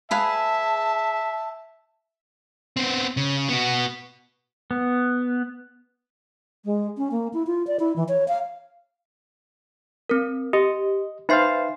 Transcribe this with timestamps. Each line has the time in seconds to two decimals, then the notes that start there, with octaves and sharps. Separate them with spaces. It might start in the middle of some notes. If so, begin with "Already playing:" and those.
0.11 G#4 B4 E5 F5 A5
2.77 B3 C4
3.17 C#3
3.49 B3 F#4
4.71 B3
6.65 G#3
6.98 C#4
7.11 A#3
7.34 E4
7.47 F4
7.67 D5
7.80 E4
7.96 E3
8.09 C#5
8.28 F5
10.09 C4 A#4
10.53 G4 D#5
11.29 D#4 B4 C5 E5 F5 C7